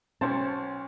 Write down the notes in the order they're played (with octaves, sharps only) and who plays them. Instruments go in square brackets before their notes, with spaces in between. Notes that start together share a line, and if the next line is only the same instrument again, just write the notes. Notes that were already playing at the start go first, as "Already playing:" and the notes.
[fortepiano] B1 C5 A5 [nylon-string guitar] C#4